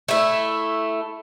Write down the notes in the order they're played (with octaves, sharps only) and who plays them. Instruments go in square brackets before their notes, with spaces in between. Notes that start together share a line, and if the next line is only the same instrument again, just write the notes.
[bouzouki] A3 E4